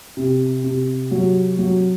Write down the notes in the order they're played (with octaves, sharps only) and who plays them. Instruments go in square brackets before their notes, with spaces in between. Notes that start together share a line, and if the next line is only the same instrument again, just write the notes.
[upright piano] C3
C3
F#3
F#3